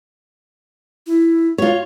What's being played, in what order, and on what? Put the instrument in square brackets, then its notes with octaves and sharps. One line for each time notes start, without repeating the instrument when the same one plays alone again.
[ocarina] E4
[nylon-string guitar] F4 C#5 [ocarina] F#4